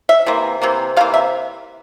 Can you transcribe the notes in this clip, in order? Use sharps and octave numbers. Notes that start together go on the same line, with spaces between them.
E5
C3 E3 A#3
C3 E3 A#3
C3 E3 A#3 F5
E5